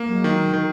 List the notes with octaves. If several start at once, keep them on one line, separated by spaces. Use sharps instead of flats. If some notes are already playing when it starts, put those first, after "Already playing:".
Already playing: A#3
F#3 G#3
D#3
D#3